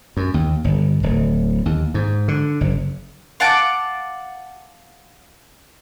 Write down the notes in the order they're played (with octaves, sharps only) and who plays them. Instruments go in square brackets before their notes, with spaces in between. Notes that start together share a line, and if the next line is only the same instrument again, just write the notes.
[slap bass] F#2
D#2
G1
D1
D#2
G#2
D3
F#1
[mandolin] F5 F#5 A5 D6